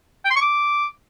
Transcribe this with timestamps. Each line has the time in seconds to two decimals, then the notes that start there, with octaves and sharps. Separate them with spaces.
0.25 G5
0.30 C6
0.36 C#6
0.42 D6